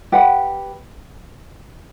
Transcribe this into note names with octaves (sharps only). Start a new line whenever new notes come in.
G4 B4 F#5 B5